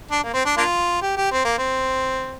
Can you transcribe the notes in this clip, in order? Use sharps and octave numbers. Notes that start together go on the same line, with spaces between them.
D4
A#3
C4
D4
A#3 D4 F4
G4
G4
C4
A#3
C4